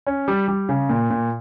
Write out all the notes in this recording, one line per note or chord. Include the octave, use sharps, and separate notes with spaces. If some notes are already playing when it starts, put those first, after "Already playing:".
C#4
G3
G3
C#3
A#2
A#2